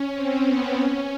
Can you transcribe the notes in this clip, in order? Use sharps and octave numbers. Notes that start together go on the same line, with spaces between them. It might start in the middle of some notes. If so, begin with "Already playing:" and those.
Already playing: C#4
C4
B3
C#4